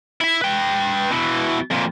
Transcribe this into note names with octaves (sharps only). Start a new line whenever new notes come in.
E4 E5
B4 G5
B2 E3
F2 A#2